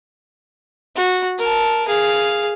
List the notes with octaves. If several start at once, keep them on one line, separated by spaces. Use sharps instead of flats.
F#4
A#4 A5
G#4 F5